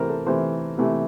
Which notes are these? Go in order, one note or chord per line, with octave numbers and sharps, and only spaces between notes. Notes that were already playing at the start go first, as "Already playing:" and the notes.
Already playing: C3 E3 A3 A#4 C5
A4
C3 E3 A3 C5
C3 E3 A3